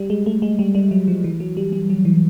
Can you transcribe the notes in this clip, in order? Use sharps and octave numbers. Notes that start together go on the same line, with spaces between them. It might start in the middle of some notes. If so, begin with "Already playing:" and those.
Already playing: G3
G#3
A3
G#3
G3
G3
F#3
F3
E3
F#3
G3
G3
F#3
E3